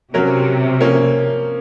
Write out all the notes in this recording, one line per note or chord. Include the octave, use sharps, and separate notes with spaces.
C3 F#3 C#4 F#4 A#4
F3 A#3 C#4